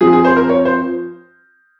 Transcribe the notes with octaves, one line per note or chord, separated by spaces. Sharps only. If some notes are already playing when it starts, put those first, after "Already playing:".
F3 C4 F4 G#4
G#4
C5
A#4
C#5
C5